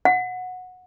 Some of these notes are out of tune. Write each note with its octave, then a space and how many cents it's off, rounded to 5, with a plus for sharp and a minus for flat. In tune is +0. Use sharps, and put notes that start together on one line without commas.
F#5 -15